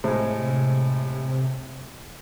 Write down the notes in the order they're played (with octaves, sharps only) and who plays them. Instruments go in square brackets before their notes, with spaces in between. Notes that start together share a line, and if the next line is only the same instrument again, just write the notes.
[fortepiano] A2 G#3 [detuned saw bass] C3 [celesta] C5 E5